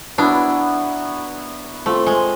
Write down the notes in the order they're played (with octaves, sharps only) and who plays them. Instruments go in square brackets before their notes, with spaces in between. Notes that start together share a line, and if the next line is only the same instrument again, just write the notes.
[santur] F#3 B3 E4 [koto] D4
[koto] A3 [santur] C4 F4 A4
[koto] G#3